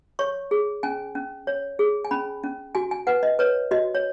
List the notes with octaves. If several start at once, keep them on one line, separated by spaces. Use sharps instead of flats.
C#5 C#6
G#4
C#4 G#5
C#4
C#5
G#4
G#5
C#4 B5
C#4
F#4 G#5
G#5
B4 F#5
D#5
B4 C#5
F#4 D#5
C#5